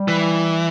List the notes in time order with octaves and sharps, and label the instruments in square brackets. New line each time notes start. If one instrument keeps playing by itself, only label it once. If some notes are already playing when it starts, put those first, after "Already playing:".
Already playing: [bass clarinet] G3
[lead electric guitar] E3